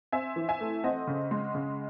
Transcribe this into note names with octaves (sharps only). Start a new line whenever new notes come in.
C4 E5 G#5
E3
E5 G#5
A3
C4 D#5 F#5
C#3
G#3
C#3